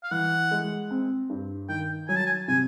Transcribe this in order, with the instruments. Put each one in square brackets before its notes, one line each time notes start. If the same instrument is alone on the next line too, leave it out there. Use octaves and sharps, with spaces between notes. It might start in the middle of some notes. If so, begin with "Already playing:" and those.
[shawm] F5
[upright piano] E3 [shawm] F#5
[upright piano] G#3
C4
G2
[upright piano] D#3 [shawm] G5
[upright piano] F#3 [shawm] G#5
[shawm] A5
G#5
[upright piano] C3 [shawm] G#5